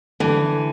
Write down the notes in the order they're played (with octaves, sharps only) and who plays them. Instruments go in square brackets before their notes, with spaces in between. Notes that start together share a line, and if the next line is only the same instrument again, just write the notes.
[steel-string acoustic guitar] D3 E3